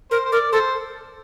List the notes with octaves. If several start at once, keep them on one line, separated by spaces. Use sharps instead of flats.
A#4 C5
C5
A#4 D5
A4 C5